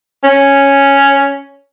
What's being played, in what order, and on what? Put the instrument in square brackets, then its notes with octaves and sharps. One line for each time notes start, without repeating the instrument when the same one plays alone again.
[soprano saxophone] C#4